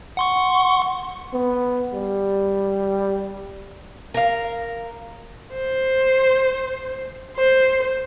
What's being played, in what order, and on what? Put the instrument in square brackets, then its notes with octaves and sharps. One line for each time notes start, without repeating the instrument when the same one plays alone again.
[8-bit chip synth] F#5 C6 C#6
[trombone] B3
G3
[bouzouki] A#4 F5
[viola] C5
C5